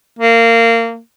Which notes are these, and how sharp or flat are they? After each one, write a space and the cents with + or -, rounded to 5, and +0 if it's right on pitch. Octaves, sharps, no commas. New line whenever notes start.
A#3 -25